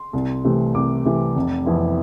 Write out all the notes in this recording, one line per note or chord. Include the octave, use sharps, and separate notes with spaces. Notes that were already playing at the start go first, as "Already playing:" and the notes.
Already playing: C6
C2
C3 E3 A3 E4
C2 D6
C3 E3 A3 E4
F1
F2 E3 B3 E4